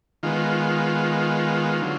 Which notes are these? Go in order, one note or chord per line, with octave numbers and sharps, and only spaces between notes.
D#3 G#3 B3 F4
D3 F#3